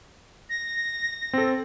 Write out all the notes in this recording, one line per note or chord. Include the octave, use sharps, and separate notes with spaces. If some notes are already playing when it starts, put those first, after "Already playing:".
A#6
C4 A4